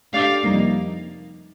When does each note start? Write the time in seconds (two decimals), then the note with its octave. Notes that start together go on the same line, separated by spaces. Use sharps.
0.13 A3 D4 G4 D5 F5
0.44 F2 C3 G3 A#3 D#4